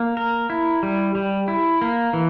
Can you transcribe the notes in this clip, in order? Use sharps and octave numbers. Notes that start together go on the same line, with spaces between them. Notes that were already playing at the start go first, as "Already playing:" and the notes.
Already playing: A#3
A#4
E4
G3
G3
E4
A#3
E3